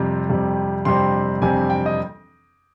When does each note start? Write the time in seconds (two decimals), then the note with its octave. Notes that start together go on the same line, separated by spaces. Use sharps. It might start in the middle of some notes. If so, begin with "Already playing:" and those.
Already playing: F2 C3 G3 C4
0.29 F2 C3 G3 C4
0.85 F2 C3 G3 C4 C6
1.41 F2 C3 G3 C4 G#5
1.70 G5
1.86 D#5